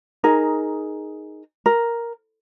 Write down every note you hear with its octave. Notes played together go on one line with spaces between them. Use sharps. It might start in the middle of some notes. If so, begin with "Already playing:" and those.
D#4 G#4 A#4
A#4